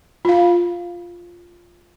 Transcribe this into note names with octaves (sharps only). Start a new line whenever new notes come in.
F4 F5